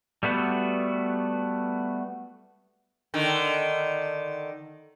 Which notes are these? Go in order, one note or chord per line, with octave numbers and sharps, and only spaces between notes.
G3 A3 B3 F#4
D3 D#3